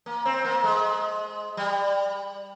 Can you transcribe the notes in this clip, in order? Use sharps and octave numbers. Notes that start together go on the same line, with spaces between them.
A#3
C4
A#3
G#3
G3